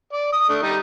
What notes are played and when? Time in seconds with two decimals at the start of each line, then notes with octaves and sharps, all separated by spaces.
0.13 D5
0.33 D#6
0.49 A3 D4
0.62 G3 D#4